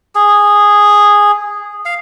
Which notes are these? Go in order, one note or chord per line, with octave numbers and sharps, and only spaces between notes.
G#4
F5